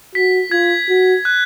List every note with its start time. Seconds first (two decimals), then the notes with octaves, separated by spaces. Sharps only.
0.15 F#4 B6
0.51 F4 G#6
0.89 F#4
1.25 F#6